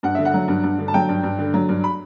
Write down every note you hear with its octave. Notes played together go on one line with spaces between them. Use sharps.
G2 F#5
D3 E5
F#5
F#3
G2
G2
D3
A5
F#3 G5
G2
G2
D3
F#3
G2
B5